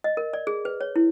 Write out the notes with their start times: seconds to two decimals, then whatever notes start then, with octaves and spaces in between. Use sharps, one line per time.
0.04 D#5
0.17 A#4
0.33 D5
0.47 G#4
0.65 B4
0.81 C#5
0.96 E4